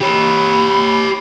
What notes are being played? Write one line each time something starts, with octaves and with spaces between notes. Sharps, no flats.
G4 C#5 B5